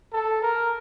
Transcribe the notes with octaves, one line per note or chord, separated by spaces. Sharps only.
A4
A#4